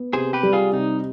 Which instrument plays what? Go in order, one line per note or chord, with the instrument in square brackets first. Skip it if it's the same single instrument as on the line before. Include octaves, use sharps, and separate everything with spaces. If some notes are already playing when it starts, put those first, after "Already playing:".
Already playing: [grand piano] B3
[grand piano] C3 [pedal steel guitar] G#4 C5
[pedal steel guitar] G4 B4
[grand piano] G3
[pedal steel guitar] F4 G#4
[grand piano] C3 [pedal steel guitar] D#4